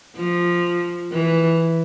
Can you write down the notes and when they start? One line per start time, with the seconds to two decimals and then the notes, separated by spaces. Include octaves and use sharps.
0.16 F3
1.12 E3